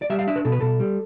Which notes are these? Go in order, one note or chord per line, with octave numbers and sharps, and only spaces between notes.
D5
G3 E5
F5
D4 E5
B4
B2 A4
B4
B2 A4
G3